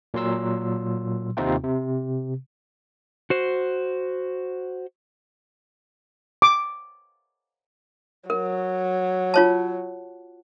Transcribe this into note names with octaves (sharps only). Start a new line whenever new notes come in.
A#2 F#3 C6 E6
D#2 C3 C4 D#4 F4 G5
C3
F#4 C5
D6
F#3 A#4
F4 C#5 A5